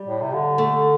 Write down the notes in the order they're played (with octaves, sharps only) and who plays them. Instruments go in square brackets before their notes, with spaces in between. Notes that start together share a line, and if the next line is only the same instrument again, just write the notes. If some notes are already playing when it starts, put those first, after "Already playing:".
Already playing: [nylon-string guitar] G3
[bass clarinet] A2
C3
D3
[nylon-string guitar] A3